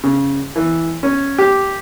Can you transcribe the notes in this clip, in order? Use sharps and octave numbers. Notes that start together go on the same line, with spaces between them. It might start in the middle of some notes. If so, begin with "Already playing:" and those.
C#3
E3
C#4
G4